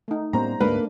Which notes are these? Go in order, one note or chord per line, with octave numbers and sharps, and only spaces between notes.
A3 D#4
A2 G3 A#3 B3 C#4 C5 A#5
D2 G#2 A3 A#3 D4 B4